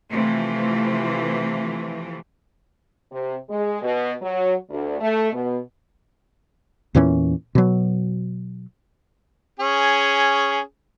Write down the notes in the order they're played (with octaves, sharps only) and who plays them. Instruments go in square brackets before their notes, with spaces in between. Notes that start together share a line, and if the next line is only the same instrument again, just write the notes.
[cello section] C3 E3 F3 A3
[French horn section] C3
G#3
B2
F#3
D2
A3
B2
[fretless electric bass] E2 A#2 E3 C#4
B2 F#3
[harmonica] C#4 G#4